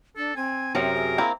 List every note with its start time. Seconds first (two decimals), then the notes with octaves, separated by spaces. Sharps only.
0.17 D4 A4
0.36 C4 G#5
0.75 F#2 C3 F#3 A#4
0.94 G#4
1.18 A#3 C4 E4